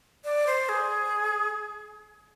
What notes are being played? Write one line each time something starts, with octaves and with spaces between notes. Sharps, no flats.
D5
C5
G#4